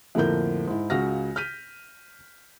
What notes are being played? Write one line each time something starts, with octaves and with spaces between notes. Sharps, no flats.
F2 A2 D3 A#3 A#4 G6
G#2 E4
C#2 C#3 F#4 F6 A#6
F6 G6 B6 D#7